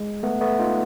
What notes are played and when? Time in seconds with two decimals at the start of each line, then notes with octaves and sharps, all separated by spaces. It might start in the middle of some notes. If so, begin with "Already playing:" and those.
Already playing: G#3
0.23 A3 B3
0.41 A3 B3
0.59 D#4 F4